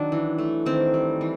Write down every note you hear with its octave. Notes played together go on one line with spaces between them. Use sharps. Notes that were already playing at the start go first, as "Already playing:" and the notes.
Already playing: D#3 F#3 D4
E3
A3
D#3 C4
G3
E3